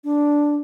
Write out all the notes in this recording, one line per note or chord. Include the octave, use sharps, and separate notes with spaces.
D4